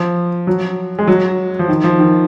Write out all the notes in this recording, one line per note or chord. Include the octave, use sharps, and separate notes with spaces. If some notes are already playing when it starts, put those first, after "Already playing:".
Already playing: F3
F#3
G#3
F#3
F3
D#3
F3
D#3